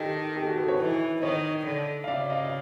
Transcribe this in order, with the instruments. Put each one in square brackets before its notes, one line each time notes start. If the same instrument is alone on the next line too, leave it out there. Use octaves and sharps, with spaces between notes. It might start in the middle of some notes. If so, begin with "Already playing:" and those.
Already playing: [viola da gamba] D#3 [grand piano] G4 A4
[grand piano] G4 A4
F#4 G#4
A4 B4
B4 C#5
[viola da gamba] E3
[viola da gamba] D#3 [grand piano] C#5 D#5
[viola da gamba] D3
[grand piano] F5
[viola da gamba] C#3 [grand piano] D5 E5
[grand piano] D#5 F5
F5